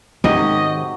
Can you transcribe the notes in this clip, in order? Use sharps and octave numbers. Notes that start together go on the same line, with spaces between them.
G#2 C3 D#3 C#4 F#4 G4 D#5